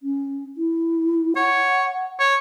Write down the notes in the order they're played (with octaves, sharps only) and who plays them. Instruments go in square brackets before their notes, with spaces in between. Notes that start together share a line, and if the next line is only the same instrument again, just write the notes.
[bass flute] C#4
E4
[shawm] C#5 [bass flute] F#5
[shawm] C#5